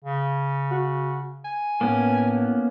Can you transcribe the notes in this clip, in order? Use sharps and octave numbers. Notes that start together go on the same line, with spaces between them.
C#3
F#4
G#5
A2 A#3 B3 C#4